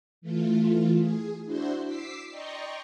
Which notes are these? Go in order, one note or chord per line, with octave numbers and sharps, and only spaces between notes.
E3 A3 F4
G#4
D4 E4 F#4 C5 C6
D6 E6 B6 C7
D5 D#5 G5 A#5 C6 C#6